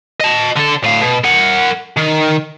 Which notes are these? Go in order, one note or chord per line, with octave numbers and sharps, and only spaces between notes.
D#5 A5
D3 A4
A2 F5
B2
A#4 F#5
D#3